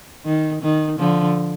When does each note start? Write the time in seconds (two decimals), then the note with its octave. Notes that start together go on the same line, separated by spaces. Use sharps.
0.25 D#3
0.62 D#3
0.99 D3 F3